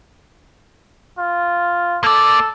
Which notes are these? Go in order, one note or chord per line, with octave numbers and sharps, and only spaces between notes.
F4
A#3 A4 D5